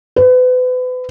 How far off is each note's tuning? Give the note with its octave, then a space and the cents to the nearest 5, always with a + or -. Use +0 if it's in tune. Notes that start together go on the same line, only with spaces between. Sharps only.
B4 +35